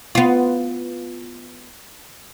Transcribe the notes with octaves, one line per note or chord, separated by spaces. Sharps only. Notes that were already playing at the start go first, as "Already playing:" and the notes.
B3 F4